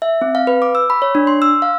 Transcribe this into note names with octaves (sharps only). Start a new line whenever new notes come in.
E5
C4
F5
B4
D6
E6
B5
C#5
D4
C6
E6
F5